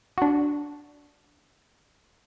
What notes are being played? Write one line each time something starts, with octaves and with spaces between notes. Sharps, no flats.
D4 F#4